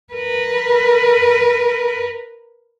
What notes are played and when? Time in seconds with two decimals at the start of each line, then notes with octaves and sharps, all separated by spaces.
0.13 A#4 B4